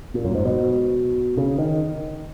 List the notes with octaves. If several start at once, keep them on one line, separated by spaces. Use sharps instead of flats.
A#2
F#2
G#2
B2
C#3
D#3